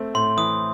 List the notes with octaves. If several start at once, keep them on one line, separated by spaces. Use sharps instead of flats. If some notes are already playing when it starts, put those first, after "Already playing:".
Already playing: A3 C4
A2 C6
E3 D#6